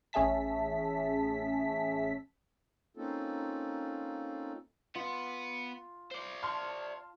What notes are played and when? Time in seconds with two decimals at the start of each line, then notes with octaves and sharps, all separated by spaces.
0.13 A1 C#4 G#4 E5 A5 B6
2.97 A#3 C4 C#4 D#4 F4 A4
4.95 B3 F4
6.11 C5 D5
6.42 A5 C6 F6